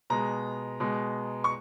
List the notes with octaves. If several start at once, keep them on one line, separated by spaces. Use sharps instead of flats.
B2 G#3 A#5
B2 G#3
C#6